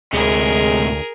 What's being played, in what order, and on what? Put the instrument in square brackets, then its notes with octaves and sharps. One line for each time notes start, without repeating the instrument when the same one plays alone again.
[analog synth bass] D2 [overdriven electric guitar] A2 C3 [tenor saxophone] G#3 [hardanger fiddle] G#4 A#4